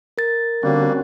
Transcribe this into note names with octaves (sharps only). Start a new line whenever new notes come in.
A#4 A6
D3 G3 A#3 C4 C#4 F#4